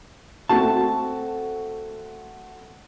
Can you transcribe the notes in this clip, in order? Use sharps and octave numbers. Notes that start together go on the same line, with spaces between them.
A3 C4 F#4 A5